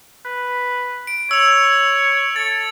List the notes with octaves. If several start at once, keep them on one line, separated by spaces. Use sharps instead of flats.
B4
D7
C#5 E6 F7
A4 A6